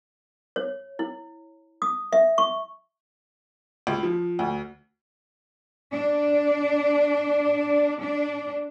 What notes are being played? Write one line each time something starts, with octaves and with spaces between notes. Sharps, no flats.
C#5
E4
D#6
E5
C#6
C#2
F3
D2
D4
D4